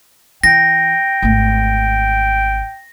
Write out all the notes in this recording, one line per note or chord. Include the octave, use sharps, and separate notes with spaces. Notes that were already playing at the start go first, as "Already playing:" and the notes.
E3 G5 A#6
G#1 A3